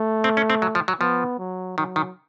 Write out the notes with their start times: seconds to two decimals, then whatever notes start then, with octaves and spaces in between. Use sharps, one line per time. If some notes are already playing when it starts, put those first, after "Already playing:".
Already playing: A3
0.24 C4
0.37 C#4
0.50 C4
0.62 F#3
0.75 F3
0.88 F#3
1.01 F3 B3
1.39 F#3
1.78 D#3 F#3
1.96 D#3